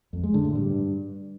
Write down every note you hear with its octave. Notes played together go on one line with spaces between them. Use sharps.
F2
G#3
D3
A2
G2